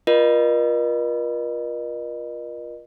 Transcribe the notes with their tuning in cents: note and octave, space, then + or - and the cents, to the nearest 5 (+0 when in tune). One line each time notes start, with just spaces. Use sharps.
F4 +0 A#4 +45 D#5 -30